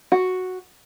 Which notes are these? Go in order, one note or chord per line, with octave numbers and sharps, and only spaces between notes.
F#4